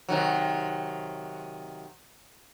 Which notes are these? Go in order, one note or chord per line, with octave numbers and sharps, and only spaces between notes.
C3 D#3 F#3